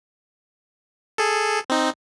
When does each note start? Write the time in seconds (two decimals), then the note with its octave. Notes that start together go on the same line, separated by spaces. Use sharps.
1.18 G#4 A4
1.70 C4 D#4